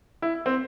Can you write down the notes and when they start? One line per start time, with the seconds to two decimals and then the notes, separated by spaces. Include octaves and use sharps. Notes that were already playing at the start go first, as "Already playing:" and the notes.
0.22 E4
0.46 C4